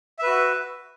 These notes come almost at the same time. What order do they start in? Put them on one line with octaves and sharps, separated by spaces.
E5 B4 F#4